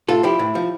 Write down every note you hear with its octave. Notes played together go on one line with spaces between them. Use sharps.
A2 F4 A4
F3 E4 G4
A2
F3